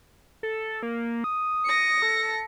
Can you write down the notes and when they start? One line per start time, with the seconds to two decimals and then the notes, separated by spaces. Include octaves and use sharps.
0.43 A4
0.83 A#3
1.24 D#6
1.65 A#6 C#7
2.02 A4